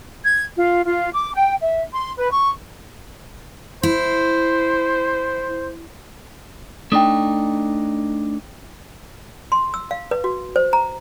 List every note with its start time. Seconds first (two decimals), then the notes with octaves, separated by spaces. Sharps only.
0.24 G#6
0.56 F4
0.85 F4
1.13 D6
1.34 G5
1.60 E5
1.93 C6
2.18 B4
2.31 C#6
3.83 E4 C5
6.92 A3 D4 D#4 G5 D#6
9.52 C6
9.74 E6
9.91 F5
10.11 B4
10.24 F#4
10.56 C5
10.73 A#5